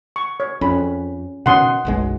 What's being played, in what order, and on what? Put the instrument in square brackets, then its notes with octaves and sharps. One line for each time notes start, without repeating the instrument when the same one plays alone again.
[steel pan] C#6
C#5
[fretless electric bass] F2 [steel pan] C#4 B5
[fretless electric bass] B2 D#3 C#4 [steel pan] F#5 C6 D#6
[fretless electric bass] F#1 B1 G#3